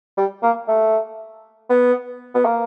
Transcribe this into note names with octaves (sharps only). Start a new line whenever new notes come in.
G3
A#3
A3
B3
B3
A#3